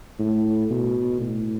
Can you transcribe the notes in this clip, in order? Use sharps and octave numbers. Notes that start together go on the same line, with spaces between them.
A2
B2
A2